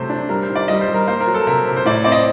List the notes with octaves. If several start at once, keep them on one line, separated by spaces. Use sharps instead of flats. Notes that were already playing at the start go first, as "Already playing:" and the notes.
Already playing: C3 F#3 A3 C5
D4
G3 A#4
C5
D#3
D5
G3 D#5
C5
G3
A#4
A#3 C5
A#4
F#3
A4
C3 A#4
C3
C5
A2 D5
C4 D5
D#5